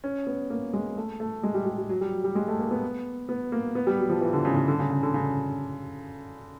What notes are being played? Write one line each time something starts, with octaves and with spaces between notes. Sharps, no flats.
C#4
B3
A#3
G#3
A3
A3
G#3
G3
G3
G3
F#3
G3
F#3
G3
G#3
A3
A#3
B3
B3
A#3
B3
G3
F#3
F3
E3
D3
C#3
C#3
D3
C#3
C#3
D3
C#3